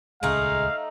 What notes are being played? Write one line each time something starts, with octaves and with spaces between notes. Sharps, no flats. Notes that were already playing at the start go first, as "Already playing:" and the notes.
D#1 C#2 G#3 A3 C#4 D#4 F5